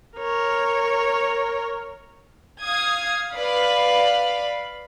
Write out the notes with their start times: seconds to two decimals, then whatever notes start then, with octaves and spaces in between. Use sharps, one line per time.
0.17 A#4 C#5
2.62 F5 D#6 G#6
3.34 B4 D5 F5 B5